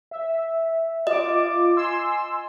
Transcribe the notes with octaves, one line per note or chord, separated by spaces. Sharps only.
E5
F4 D#5 D6
G#5 C6 E6